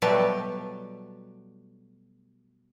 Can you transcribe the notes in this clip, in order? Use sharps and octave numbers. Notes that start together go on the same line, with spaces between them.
B2 F#3 G3 A3 B4 A5